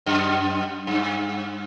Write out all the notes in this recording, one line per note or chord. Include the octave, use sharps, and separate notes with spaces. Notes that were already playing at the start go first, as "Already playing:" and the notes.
F#2
G2